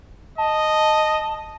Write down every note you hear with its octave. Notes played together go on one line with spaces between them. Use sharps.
D#5 A5